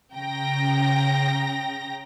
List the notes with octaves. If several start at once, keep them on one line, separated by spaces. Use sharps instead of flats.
C#3 G5 A#5 A#6